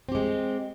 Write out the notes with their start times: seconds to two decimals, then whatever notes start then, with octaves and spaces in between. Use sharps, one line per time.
0.09 C4
0.12 G4
0.15 G#3